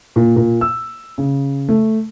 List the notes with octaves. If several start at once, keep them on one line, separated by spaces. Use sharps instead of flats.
A#2
A#2
E6
C#3
A3